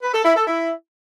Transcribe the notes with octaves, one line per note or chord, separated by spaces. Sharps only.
B4
A4
E4
A4
E4